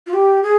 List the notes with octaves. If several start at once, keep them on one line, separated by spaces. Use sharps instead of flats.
F4
G4
G#4